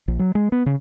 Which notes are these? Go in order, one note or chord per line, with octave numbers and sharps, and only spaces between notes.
A#1
F#3
G#3
B3
C#3